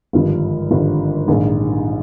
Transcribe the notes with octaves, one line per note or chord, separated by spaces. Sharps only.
G#1 G2 D3 F3
G#1 G2 D3 F3
A#1 G#2 D#3